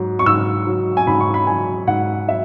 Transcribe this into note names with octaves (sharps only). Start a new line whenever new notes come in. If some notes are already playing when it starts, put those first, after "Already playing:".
Already playing: G#2 F#3
C#6
G#2 E6
F#3
G#5
G#2 B5
C#6
B5
F#3 G#5
G#2 F#5
F#3 E5